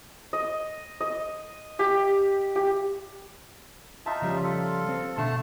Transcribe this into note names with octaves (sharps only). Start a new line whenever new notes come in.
D#5
D#5
G4
G4
D#4 F4 E5 A5
C#3 F3 G3
F4 A4
C4
B2 D3 A3 A5